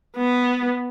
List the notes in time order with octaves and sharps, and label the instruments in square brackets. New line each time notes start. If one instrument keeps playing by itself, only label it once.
[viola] B3